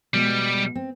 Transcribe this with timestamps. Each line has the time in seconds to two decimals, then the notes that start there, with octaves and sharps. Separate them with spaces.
0.14 B2 G3 G#3
0.75 C4